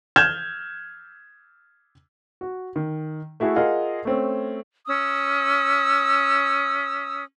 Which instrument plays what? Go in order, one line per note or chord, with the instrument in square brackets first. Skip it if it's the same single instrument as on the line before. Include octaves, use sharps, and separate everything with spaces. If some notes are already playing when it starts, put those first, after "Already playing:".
[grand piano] F6 G6 G#6 E7
[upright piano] F#4
D#3
A3 E4 F#4 G#4 A4
F4 G#4 A#4 D#5 F5 F#5
A3 C4 C#4
[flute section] C#4 D#6 E6